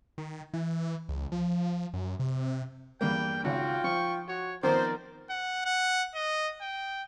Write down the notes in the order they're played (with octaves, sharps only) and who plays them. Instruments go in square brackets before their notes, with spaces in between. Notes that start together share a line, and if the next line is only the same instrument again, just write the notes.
[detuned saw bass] D#3
E3
C#2
F3
F#2
C3
[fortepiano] E2 G2 A#3 [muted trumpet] G5
[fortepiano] G#1 C#2 [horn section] F4 G5 [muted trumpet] F#4
[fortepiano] F3 [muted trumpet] C#6
[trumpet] F#4 [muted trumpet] C#5
[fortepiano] D#3 F3 B3 [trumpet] A#4 [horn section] C5 [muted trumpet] D5
[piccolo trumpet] F#5
F#5
D#5
G5